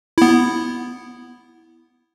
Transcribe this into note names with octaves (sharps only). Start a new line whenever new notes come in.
B3 E4